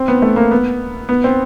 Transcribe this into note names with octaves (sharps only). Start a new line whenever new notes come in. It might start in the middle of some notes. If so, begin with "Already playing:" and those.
Already playing: C4
B3
A3
A#3
B3
B3
C4